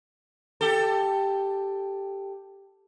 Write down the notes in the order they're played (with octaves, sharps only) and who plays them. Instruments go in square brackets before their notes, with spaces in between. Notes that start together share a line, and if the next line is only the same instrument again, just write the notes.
[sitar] G4 A4